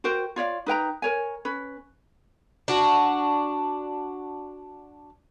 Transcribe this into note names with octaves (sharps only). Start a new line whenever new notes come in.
F#4 A#4 C5 G5
F4 C#5 D5 F5
D#4 B4 G5 A#5
A#4 C#5 G#5
C#4 B4
D4 F#4